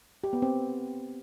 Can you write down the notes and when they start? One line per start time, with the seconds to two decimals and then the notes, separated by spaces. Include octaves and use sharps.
0.24 G4
0.33 B3
0.42 C4